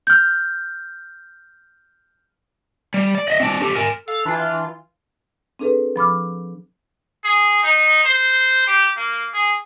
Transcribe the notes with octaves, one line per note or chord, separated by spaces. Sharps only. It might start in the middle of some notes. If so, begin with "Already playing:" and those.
F6 G6
G3
D5
D#5 E5
C4 D4
G4 A4
A#4 G#5
A4 F5
E3 D4 F4
C4 D4 G#4 A4 B4
F3 B5 D6 F6
G#4
D#4
C5
G4
A#3
G#4